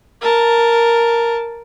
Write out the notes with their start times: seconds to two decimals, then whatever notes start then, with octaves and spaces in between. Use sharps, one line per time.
0.21 A#4 A5